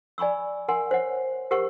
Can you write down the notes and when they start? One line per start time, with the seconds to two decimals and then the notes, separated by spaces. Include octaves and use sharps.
0.18 D5 G#5 B5 C#6 E6
0.68 A#4 F#5 G#5 C6
0.91 C5 C#5 F#5
1.51 G4 A#4 C5 F#5 C#6